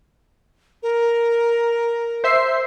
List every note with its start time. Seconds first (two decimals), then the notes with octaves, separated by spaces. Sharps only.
0.83 A#4
2.24 C5 E5 C7